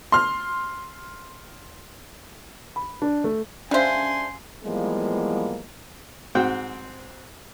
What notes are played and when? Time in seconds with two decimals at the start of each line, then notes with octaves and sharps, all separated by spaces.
0.12 C6 F6
2.76 B5
3.02 D4
3.24 A3
3.71 G3 C#4 D4 C5 E5 F5 G#5 C6
4.64 E3 F3 G3 G#3 A#3 B3
6.35 G#2 C4 F#4 G5